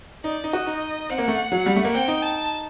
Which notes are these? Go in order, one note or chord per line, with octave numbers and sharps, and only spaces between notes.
D#4 D5
D#4
F#4 D#5
D#4
C4 F#5
A#3
A3
F#3
G3
A3
A#3
C4 G5
D#4
A5